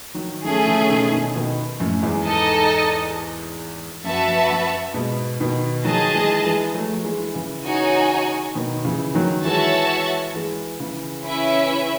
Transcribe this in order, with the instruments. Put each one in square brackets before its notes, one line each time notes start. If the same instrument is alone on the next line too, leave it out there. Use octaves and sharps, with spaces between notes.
[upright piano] D#3 F#3
[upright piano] D#3 F#3 [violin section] A3 C#4 G#4
[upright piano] C#3 E3
B2 D#3
B2 D#3
B2 D#3
F#2 A2
E2 G#2
[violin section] D#4 A4 D#5 A5
[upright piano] F#2 [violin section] F#4 B4 E5 A5
[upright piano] F#2
F#2
G#2 B2
B2 D#3
[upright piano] D#3 F#3 [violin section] G#4 D#5 A5
[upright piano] E3 G#3
E3 G#3
F#3 A3
F#3
E3 G#3
C#3 E3
[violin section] D#4 F#4 C#5 G#5
[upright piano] B2 D#3
C#3 E3
D#3 F#3
[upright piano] E3 G#3 [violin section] F#4 C#5 E5 A5
[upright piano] E3 G#3
C#3 E3
[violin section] C#4 E4 B4 E5